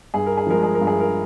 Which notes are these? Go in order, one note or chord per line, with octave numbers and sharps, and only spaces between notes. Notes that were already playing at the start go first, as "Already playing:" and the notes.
G2 G#4
A#4
G#4
F3 G#3 A#4
G#4
A#4
G2
G#4
A#4